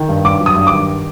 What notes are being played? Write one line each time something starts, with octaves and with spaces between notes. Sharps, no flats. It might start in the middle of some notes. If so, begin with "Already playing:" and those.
Already playing: D#3
G2
G2 D6
F#3
D#6
G2
D6
D#3